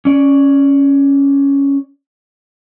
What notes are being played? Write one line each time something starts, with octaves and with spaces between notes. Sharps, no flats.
C#4 D5